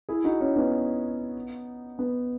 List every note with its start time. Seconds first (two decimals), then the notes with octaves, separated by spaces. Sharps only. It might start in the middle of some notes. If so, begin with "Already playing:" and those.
0.09 E4 G#4
0.24 D#4 F#4
0.40 C#4 E4
0.56 B3 D#4
1.99 B3